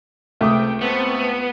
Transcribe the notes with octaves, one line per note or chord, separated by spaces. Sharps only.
C#2 C3 A3 G5 D6 D#6
B3 C4 A5 C#6